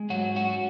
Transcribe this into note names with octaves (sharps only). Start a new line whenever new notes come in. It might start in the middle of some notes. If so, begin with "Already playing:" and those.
Already playing: G#3
G#2 F#3 F#4
F#3 C#4 F#4